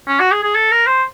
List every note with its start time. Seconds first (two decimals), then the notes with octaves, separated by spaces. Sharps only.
0.08 C#4
0.20 F#4
0.32 G#4
0.43 G#4
0.55 A4
0.72 A#4
0.87 C5